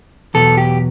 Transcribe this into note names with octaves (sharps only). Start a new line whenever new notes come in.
E2 B2 F#3 A4
G4